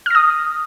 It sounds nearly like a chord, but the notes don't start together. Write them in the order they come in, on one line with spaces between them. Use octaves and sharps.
F6 A#6 D#6